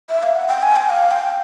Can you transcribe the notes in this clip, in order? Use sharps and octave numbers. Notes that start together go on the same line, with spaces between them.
E5
F5
F#5
G5
G#5
G5
F5
G5